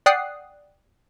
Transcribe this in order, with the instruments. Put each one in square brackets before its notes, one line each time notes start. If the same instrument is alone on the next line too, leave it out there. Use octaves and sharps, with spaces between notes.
[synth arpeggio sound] D5 F#5 G5 D#6 F#6 C7